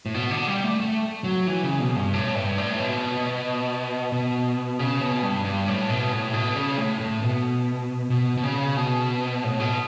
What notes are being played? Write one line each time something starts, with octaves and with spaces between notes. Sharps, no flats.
A2
B2
D3
G3
A3
A3
F#3
E3
C#3
B2
G2
A2
G2
A2
B2
B2
C#3
B2
G2
G2
A2
B2
A2
B2
C#3
A2
A2
B2
B2
B2
C#3
B2
A2
B2